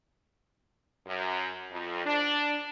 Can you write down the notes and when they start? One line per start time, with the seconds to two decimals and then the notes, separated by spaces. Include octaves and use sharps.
1.07 F#2
1.71 F2
2.06 D4